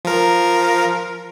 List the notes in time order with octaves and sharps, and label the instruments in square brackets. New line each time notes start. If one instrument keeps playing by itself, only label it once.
[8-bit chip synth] F3 A#4